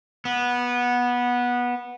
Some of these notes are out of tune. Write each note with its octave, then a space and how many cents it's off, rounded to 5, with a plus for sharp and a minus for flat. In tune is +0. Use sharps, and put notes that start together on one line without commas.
B3 -15